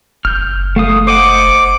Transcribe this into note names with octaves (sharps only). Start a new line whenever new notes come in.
F#1 F6 G6
A3 F5 D#6
C5 D#5 F#5 D6